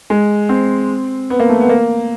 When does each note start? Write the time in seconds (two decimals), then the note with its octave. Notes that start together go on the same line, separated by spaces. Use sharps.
0.10 G#3
0.49 C4
1.30 B3
1.40 A#3
1.49 A3
1.60 B3
1.69 A#3